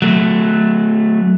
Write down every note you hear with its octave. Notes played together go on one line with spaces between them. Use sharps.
F#3 A3